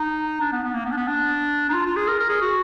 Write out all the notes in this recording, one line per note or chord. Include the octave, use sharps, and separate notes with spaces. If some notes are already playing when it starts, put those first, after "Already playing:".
Already playing: D#4
D4
B3
B3
A#3
B3
D4
B3
D4
D#4
F4
F4
G#4
A#4
A#4
G#4
F#4